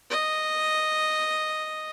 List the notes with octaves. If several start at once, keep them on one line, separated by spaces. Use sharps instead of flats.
D#5